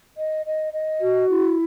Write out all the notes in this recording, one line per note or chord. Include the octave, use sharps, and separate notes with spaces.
D#5
D#5
D#5
F#4
E4